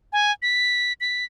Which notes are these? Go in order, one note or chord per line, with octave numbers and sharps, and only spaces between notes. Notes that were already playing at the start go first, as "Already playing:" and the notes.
G#5
B6
B6